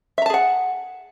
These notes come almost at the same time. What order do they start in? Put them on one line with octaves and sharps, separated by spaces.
E5 A#5 A5 G#4 F#5